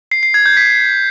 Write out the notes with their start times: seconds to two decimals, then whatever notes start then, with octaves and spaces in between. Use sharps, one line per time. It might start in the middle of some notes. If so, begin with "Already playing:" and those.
0.12 C7
0.23 C7
0.34 G#6
0.46 G6
0.57 B6